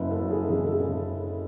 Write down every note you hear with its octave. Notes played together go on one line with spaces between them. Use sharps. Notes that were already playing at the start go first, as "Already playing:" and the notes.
Already playing: F#1 F#2 C#3 B4 D#5 E5
A4
F#3
G#4
A4
F#1 G#4
A4
G#4
C#3 A4